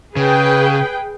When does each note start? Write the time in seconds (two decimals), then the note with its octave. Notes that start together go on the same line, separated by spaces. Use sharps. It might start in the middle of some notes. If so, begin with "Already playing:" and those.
0.16 C#3 G#4 B4 G5